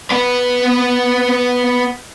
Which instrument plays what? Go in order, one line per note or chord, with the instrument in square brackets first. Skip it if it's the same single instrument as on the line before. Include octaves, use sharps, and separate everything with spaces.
[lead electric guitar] B3 B4